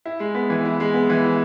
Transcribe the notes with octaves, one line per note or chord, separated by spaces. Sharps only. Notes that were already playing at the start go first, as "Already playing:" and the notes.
E4
G#3
B3
E3
E4
G#3
B3
E3
E4